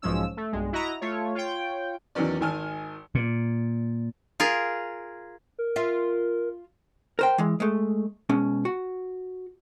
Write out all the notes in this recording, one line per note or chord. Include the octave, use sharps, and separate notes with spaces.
B1 G#2 F3 G#3 C#4 E6
A3
B1 G2 G#3
E4 F#4 D#5 A#5
A3 F4 C#5
F4 C#5 G5
E2 D#3 F#3 B3 C#4 D5
G#1 D#3 G#5 A5 F6
A#2
F4 G#4 A#4
A#4
F4 E5
A#4 C5 G5
E3 G#3
G#3 A3
B2 G#3 C#4
F#4